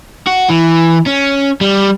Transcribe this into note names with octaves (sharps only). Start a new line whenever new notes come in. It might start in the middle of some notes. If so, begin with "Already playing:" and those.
F#4
E3
C#4
G3